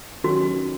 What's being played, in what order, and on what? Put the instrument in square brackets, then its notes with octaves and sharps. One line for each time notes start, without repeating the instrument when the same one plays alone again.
[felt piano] D#3 F#3 C#4 [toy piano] F#4